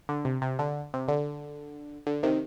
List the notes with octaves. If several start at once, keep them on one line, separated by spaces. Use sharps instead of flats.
D3
C3
C3
D3
C3
D3
D3
C3 D#3